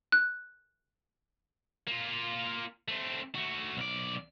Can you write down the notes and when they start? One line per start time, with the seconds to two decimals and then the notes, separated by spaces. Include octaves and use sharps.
0.12 F#6
1.88 A#3 F4
2.88 A3 C4
3.35 A3 F#4
3.77 B1 D5